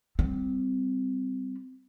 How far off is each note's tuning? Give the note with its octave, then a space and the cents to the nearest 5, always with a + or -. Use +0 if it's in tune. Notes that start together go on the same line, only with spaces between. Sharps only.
G3 +0 C4 -15